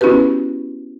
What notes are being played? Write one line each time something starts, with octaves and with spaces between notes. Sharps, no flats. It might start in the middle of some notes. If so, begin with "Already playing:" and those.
B3 C#4 E4 F#4 G4 B4